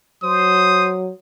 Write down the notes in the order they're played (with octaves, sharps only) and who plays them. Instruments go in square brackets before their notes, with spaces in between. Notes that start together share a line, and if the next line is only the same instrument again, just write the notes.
[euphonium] F#3 [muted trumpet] C5 [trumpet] D#6